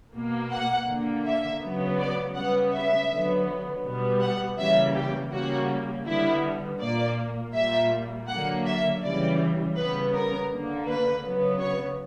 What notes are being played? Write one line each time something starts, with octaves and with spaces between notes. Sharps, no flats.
B2 A#3
F#5
D3 A#3
E5
C#3 F#3 B3
D5
C#3 G3 B3 F#5
E5
D3 F#3 B3
B2 G3 B3
F#5
C#3 E3 G3 A#3 E5
G4
C#3 G3 A#3 F#4
D3 G3 B3 E4
A#2 A#3 D5
A#2 G3 A#3 E5
D3 F#3 A#3 F#5
E5
C#3 E3 G3 D5
C#3 G3 B3 B4
A#4
D3 A#3
B4
C#3 F#3 B3
C#5